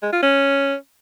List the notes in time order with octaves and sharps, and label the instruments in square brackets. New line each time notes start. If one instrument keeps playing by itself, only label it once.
[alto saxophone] G#3
F4
C#4